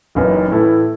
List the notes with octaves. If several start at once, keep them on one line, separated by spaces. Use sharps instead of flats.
F#1 F#2 E3 B3 D#4
A2 E3 A3 E4 A4